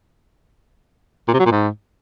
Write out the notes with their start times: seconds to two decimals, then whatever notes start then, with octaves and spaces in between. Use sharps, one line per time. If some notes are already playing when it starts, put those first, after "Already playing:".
1.28 A#2
1.34 C3
1.40 F#3
1.46 A#2
1.51 G#2